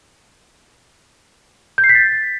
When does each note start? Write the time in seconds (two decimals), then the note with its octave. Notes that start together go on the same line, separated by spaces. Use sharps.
1.78 G6
1.84 C7
1.89 B6
1.95 A6